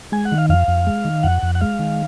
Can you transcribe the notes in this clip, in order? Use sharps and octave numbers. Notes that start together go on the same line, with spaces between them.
G#3 G#5
F#5
D#3
F5
F2 F5
F2
G#3
D#3
F2 F#5
F2
F#5
G#3 F5
D#3